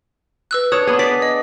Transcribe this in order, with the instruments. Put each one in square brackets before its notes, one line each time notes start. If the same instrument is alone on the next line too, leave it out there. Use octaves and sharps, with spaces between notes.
[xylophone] B4 E6 F#6
[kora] D4 C#5 [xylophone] D#6
[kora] B3 G#4
[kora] D5 [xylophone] B6
[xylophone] D#5